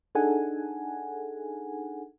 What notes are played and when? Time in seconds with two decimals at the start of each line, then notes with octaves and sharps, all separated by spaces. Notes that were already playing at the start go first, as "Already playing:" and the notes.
0.15 D4 D#4 G#4 A4 F#5 G#5